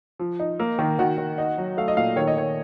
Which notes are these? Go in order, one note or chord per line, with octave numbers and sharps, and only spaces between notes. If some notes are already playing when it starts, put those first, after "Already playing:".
F3
D#4
A#3
D#3
D#3 F#4
D#3
D#4
F#3
A3 F5
D#5
A#2 F5
D#3 C#5
D#5
D#3 C#5